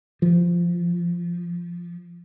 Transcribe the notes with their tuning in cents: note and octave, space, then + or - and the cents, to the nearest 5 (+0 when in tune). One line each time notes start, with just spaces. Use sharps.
F3 -10